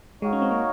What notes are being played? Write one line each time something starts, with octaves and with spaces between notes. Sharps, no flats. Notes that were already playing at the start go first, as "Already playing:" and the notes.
G#3 D#4 F#4 C#5 F5
C#4
C4
A#3